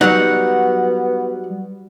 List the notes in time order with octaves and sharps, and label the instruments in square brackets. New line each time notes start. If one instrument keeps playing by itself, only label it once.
[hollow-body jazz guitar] F#3 G3 D#4 [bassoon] B3 [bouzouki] F#5